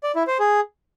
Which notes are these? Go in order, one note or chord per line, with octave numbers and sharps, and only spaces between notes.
D5
E4
C5
G#4